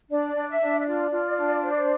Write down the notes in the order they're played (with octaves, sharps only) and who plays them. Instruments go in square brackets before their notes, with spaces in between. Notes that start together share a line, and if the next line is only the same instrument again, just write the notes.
[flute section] D4 D5
D4
E5
D4
E5
F4 D5
F4
D4
C5